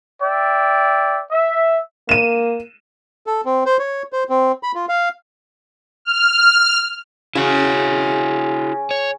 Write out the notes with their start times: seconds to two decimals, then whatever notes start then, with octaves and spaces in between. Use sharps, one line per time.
0.22 D5 E5 G5
1.31 E5
2.09 A#3 D#7 E7
3.27 A4
3.45 C4
3.66 C5
3.79 C#5
4.13 C5
4.30 C4
4.63 B5
4.75 F4
4.89 F5
6.05 F6
7.35 C#3 E4 F#4
8.91 C#5